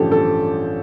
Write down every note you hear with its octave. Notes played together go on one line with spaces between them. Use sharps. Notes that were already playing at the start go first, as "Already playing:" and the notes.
Already playing: A1 G2 D3 F3 G4 A4
A4